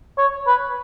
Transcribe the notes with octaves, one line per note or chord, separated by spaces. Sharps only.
C#5
B4